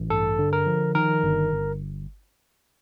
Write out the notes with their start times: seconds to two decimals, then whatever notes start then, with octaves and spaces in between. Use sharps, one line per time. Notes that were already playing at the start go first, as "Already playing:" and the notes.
Already playing: A1
0.10 G2 A4
0.39 D3
0.53 A#4
0.67 F3
0.95 D#3 A#4
1.23 G1
1.51 G1